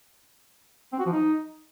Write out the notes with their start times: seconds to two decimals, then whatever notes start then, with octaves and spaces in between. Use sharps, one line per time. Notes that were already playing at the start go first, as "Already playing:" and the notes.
0.93 C4
0.99 F#4
1.06 F3
1.12 D#4